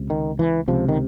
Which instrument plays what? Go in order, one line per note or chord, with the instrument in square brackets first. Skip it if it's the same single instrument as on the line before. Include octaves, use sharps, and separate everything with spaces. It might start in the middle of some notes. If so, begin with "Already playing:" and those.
Already playing: [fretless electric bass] C#2 C3
D#3
E3
C#2 C3 F3
D#3